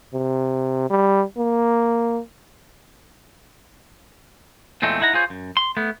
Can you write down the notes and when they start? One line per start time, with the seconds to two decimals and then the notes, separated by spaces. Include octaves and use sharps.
0.13 C3
0.90 G3
1.37 A#3
4.82 E2 A#2 G#3 A3 C4
5.01 D#4 E4 F#5 A#5
5.13 F4 G#4 C5 C#5
5.30 F#2
5.57 C6
5.77 A3 B3